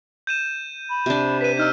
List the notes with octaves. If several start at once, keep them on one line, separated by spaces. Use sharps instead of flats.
G6 D#7 E7
B5
C3 D4
B4 B6 D#7
D#4 E6 F6 G6